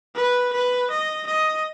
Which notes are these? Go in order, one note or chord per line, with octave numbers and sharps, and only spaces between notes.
B4
B4
D#5
D#5